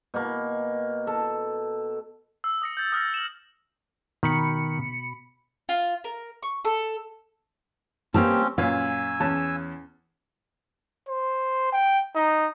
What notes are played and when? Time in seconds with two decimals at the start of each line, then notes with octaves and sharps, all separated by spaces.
0.14 B2 A#3
1.07 A4
2.44 E6
2.62 D#6 A#6 C#7
2.77 G6 A6
2.92 D#6 F6 A6 A#6
3.14 E7 F#7
4.23 B2 D#3 B5 C#7
5.69 F4
6.04 A#4
6.43 C#6
6.65 A4
8.14 A#3 C4 C#4 G4 A5
8.58 F#2 A#2 F5 G#5 E6
9.20 E2 C#4 A5
11.09 C5
11.73 G5
12.15 D#4